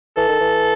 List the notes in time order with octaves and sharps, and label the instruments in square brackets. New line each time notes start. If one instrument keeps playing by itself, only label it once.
[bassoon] E3 [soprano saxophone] A4
[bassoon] D#3
E3